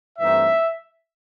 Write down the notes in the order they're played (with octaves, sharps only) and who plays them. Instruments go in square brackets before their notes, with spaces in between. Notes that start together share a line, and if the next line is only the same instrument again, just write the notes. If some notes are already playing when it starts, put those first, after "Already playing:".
[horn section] G2 E3 A3 C4 D#4 E5